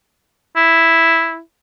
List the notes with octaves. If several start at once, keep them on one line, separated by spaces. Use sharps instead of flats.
E4